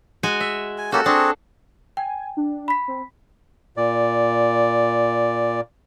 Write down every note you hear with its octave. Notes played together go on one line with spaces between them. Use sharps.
G#3 F#4 G#5
E5
G#5
A#3 C#4 F#4 G4 A4
C4 D4 F#4 G#4 A5
G5 G#5
D4
B5 B6
C4
A#2 D5